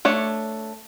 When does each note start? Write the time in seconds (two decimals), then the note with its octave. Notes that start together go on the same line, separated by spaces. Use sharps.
0.05 A3 D4 C#5